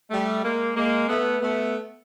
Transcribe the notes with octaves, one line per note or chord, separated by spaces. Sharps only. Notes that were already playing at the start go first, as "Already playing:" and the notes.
G3 A3
G#3 A#3
G#3 A#3
A3 B3
A3 B3